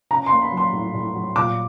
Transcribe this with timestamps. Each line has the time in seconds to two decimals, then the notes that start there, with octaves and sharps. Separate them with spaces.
0.11 C#4 A#5
0.26 C6
0.31 A#3
0.42 B5
0.52 F#3
0.57 C6
0.73 A2
0.94 A2
1.15 F#3
1.36 A#2 D6